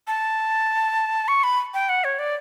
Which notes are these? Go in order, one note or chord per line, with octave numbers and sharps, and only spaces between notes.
A5
C#6
B5
G5
F#5
C#5
D5